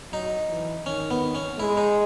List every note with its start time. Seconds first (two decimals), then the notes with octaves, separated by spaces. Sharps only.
0.12 F#3 D#4
0.49 E3
0.86 D#3 C#4
1.11 B3
1.35 C#4
1.59 G#3 E4
1.77 D#4